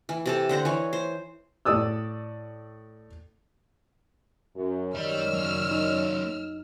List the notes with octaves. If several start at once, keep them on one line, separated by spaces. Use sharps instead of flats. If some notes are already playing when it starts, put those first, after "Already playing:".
E3
C3 A4 A5
D3 C5 F#5 A#5
E3 C#5
C5
A2 D5 D#6 E6
F#2
F#2 D#3 G3 C#5 D5 B5 E6 F6
F#3 A#3
D#4